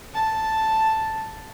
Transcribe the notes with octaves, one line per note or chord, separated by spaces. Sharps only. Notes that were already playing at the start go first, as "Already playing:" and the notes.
A5